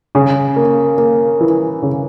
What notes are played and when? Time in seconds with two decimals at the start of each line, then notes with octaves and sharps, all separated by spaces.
0.15 C#3
0.56 A#3
0.98 A#3
1.40 E3
1.83 C#3